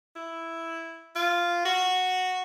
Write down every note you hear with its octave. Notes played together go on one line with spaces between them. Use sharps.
E4
F4
F#4